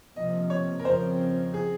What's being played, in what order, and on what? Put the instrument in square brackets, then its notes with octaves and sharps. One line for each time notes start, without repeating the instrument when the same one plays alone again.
[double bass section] C3 F3 A#3 [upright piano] D#5
[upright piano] C#5
A#4
[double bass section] F2 C#3 F3 C4 [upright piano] C5
[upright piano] G#4